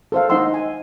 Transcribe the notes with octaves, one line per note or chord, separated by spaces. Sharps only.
A4 C5 F5
D#4 C5 D#5 F#5 C6 E6
G#5